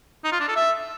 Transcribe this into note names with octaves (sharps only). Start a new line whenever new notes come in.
D#4
F4
D4
A4
E5